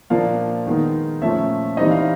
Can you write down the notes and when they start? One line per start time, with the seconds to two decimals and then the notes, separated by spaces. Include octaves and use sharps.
0.10 A#2 F3 A#3 D4 F5
0.66 D#3 G#3 B3 D#4
1.22 A#2 F3 A3 C#4 E5
1.77 E3 G3 C4 D#4 D#5
1.91 F5